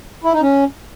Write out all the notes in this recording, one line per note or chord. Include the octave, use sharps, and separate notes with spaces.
E4
D#4
C#4